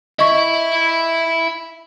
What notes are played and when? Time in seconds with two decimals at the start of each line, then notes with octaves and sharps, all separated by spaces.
0.19 E4 D#5 E5 C#6